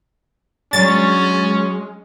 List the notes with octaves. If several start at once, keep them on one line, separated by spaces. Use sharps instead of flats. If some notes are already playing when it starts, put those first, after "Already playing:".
F#3 G#3 C#4 D4 A6